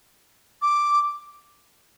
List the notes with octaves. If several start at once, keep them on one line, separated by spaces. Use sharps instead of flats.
D6